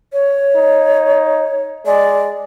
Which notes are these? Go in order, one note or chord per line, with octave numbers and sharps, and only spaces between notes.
C#5
D#4
G#3 D5